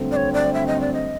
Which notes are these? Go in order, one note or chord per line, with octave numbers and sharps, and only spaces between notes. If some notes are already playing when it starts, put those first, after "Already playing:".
Already playing: G2 D3 F#3 A3 C4
D5
C#5
D5
E5
D#5
D5
D#5